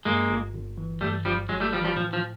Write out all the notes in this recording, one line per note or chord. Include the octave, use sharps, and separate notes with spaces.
G2 G#3 A#3
G1
G1
E3
G2 G3 A3
G1 F3 G3
G1 F#3 G#3
G3 A3
E3 F3 G3
F3 G3
A2 F3
F3